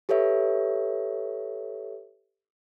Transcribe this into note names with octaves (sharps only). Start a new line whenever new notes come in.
G4 A4 B4 C#5 E5